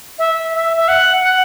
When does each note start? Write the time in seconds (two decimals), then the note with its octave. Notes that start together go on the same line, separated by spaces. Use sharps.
0.19 E5
0.54 E5
0.77 E5
0.88 F#5
1.22 F#5